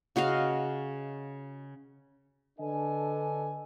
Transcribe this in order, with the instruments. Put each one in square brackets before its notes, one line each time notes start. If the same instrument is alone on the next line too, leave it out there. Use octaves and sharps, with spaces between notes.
[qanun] C#3 F#4 D#5 F5
[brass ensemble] D3 D4 A4 B4 D#5 G#5